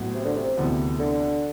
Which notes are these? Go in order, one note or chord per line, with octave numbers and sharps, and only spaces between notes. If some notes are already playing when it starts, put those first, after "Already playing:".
Already playing: A1 A2 F#3 B3
C3
D3
C3
D2 C3 E3 B3
D3